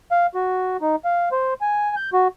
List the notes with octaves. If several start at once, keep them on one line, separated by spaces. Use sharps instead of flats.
F5
F#4
D#4
F5
C5
G#5
G6
F#4